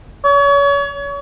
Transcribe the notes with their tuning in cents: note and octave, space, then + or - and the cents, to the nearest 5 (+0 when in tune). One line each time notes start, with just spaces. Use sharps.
C#5 +35